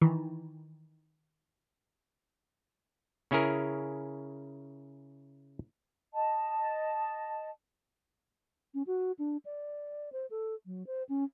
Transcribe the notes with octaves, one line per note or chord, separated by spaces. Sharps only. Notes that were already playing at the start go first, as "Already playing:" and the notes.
D#3 E3
C#3 C#4 E4 G#4 A#4
D#5 A5
C#4
F#4
D4
D5
C5
A4
F#3
C5
C#4